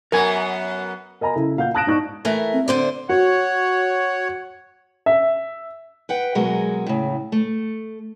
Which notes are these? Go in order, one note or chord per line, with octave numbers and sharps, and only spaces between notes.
F#2 B3 A#4 G#5
A#4 D#5 G#5 A#5 B5
C#3 E4 A4
A#2 F5 F#5 G6
A5 D#6 F#6 A#6 D7 E7
G#2 D#4 D5 C#6 F#6
E3 A3 A#4
C4
D3 C5 D5
F#4 C#5 F#5
E5
B4 F#5 G5
B2 F#3 G#3 F#4 G#4 A#4
A2 C#3
A3